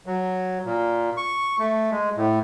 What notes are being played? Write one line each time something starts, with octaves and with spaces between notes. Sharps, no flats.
F#3
A#2
C#6
A3
G#3
A2